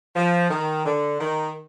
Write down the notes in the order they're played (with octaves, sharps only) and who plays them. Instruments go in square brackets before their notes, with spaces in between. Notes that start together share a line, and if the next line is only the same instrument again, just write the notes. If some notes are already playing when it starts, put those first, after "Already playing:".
[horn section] F3
D#3
D3
D#3